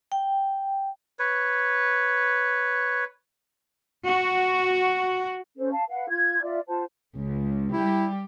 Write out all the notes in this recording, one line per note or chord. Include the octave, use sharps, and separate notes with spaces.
G5
B4 C#5
F#4
C#4 A4 C5
F5 A5
B4 F5 F#5
F4 G#6
F4 D5 E5
F4 C5 F#5 A5
C#2
G3 E4 G4